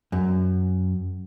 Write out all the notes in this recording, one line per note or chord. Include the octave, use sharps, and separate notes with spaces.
F#2